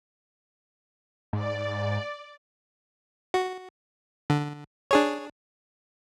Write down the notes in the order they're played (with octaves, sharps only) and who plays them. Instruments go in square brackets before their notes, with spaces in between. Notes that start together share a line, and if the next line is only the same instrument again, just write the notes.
[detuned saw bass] G#2 [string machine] D5
[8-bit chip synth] F#4
D3
D4 G#4 C#5